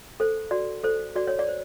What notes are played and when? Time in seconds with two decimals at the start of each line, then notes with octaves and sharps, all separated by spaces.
0.20 A4 C5
0.51 F#4 D5
0.83 A4 C5
1.16 F#4 D5
1.27 C#5
1.39 D5
1.49 C5